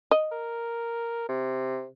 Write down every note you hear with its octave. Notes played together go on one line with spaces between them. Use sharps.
D#5
A#4
C3